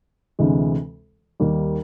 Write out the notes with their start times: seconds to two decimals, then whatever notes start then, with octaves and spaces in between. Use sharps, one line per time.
0.39 D2 C3 E3 G#3
1.40 D#2 D#3 G3 A#3